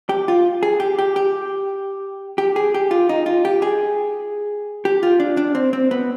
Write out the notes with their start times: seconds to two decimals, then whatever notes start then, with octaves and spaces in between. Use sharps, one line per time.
0.09 G4
0.28 F4
0.63 G#4
0.80 G4
0.99 G4
1.16 G4
2.38 G4
2.56 G#4
2.74 G4
2.91 F4
3.09 D#4
3.26 F4
3.45 G4
3.62 G#4
4.85 G4
5.03 F4
5.20 D4
5.37 D4
5.55 C4
5.73 C4
5.91 B3